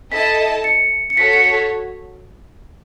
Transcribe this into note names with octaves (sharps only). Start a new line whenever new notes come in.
E4 A4 D#5 A5 B6
C#7
C#7
F#4 A4 C#5 B6
C#7
B6